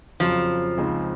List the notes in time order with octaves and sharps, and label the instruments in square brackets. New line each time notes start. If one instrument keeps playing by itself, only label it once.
[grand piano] F2 C#3 F#3 [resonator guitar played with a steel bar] F3
[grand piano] C#2 C#3 G#3 C4 D#4